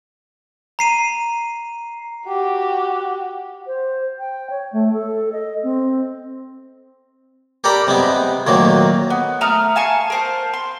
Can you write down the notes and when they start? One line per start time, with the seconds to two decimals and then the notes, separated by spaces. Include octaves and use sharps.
0.79 A#5 C7 D#7
2.26 F#4 G4
3.67 C5
4.19 G5
4.50 C#5
4.73 A3
4.93 A4
5.32 D#5
5.63 C4
7.64 G4 A4 A#4 D5 A#5 B5
7.87 C3 G3 G#3 B3
8.47 D2 A#2 D#3 F#3 A#3
9.10 B3
9.41 A3 A#5 D#6 F6
9.76 F5 G#5 A5 C#6
10.10 A#4 C5 A5
10.54 C6